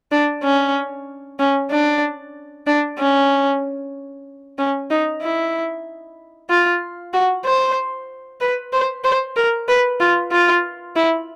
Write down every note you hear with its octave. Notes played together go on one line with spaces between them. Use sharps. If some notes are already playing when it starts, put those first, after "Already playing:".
D4
C#4
C#4
D4
D4
C#4
C#4
D#4
E4
F4
F#4
C5
B4
C5
C5
A#4
B4
F4
F4
E4